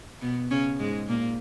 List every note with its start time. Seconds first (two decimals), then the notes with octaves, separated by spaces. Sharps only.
0.21 B2 B3
0.50 C#3 C#4
0.80 G#2 G#3
1.08 A#2 A#3